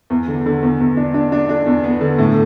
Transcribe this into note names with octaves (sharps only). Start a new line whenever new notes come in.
E2
D3
D3
E2
E2
D4
D4
D4
D4
E2
B3
D3
A2